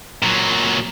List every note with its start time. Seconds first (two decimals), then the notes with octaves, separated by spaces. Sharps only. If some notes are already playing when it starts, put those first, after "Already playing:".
0.22 A#2 F#3